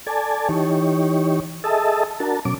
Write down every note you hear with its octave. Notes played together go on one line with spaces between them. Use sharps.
A4 D5 G#5 A5
E3 D#4 G4 C#5
G#4 A4 D#5 E5 A5
D4 F#4 A#4 A5
B2 F#3 C#4 D6